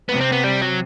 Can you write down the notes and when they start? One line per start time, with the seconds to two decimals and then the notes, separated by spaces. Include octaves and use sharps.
0.09 C3 B3
0.21 C4
0.32 B3
0.44 G3
0.62 F#3